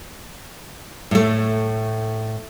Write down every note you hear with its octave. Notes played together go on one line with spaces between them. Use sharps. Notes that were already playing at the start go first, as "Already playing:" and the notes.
A2 A3